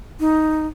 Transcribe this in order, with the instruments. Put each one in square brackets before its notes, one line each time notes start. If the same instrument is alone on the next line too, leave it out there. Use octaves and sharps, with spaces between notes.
[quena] D#4